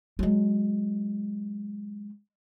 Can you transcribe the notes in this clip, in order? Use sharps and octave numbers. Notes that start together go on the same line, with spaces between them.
F#3 G#3